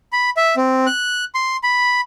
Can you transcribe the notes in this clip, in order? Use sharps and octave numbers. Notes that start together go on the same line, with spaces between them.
B5
E5
C4
F#6
C6
B5